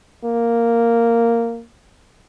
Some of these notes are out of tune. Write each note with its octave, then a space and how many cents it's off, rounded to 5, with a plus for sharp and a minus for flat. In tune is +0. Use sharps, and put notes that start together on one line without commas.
A#3 -5